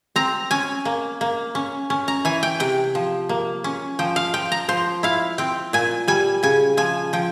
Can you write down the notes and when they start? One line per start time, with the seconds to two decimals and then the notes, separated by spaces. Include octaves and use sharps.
0.16 C4 A#5
0.51 C#4 G#5
0.85 A#3
1.21 A#3
1.55 C#4
1.90 C#4
2.08 A#5
2.25 E3 G#5
2.43 G5
2.60 C3 G5
2.95 F3
3.29 A#3
3.64 C#4
3.99 F3 G5
4.16 F5
4.34 F3 G5
4.52 A#5
4.68 F3 C5
5.03 E4 F5
5.38 C4 G5
5.73 A#2 G#5
6.08 G3 G#5
6.43 C#3 G#5
6.77 F3 G#5
7.13 F3 G5